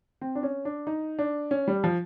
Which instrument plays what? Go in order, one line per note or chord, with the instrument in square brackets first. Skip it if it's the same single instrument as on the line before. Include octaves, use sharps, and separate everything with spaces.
[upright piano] C4
D4
C#4
D4
D#4
D4
C#4
G3
F3